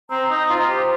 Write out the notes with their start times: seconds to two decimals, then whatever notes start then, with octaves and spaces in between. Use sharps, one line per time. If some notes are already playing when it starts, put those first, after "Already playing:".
0.10 C4 A#5
0.30 D#4
0.50 F4 C5
0.69 G4